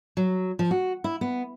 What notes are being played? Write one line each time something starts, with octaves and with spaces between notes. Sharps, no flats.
F#3
F3
F#4
E4
B3